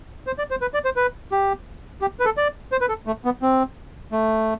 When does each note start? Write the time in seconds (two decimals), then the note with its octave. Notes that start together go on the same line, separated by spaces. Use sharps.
0.27 C5
0.38 D5
0.51 C5
0.61 B4
0.74 D5
0.85 C5
0.96 B4
1.32 G4
2.01 G4
2.20 B4
2.25 A4
2.37 D5
2.72 C5
2.81 B4
2.89 A4
3.07 A3
3.25 B3
3.42 C4
4.12 A3